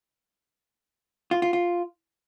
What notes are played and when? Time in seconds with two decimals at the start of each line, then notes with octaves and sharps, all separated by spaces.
1.31 F4
1.42 F4
1.53 F4